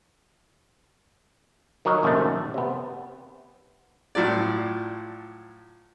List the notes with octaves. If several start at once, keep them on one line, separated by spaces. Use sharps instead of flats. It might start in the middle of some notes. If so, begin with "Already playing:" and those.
D#3 F#3 A#4 C#5 D#5
A#1 F#2 C3 D#3 A3
C3 B3
A2 F3 F#3 D5